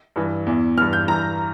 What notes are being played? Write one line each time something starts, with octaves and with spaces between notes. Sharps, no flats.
G2 E3
E2 E3
G2 E3 F6
G6
G2 E3 A#5